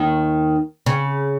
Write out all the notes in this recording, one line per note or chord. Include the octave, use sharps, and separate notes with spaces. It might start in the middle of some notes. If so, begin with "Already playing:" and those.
Already playing: D#2 D#3
C#3